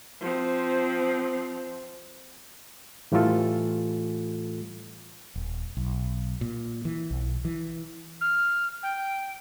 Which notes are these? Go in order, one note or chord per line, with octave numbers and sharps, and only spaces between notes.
F3 C4
A2 E3 G3 A3 F4 A4
D#1
B1
A#2
E3
B1
E3
F6
G5